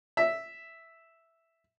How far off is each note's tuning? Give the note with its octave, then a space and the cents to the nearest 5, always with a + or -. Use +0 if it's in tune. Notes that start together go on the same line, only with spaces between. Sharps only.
E5 +0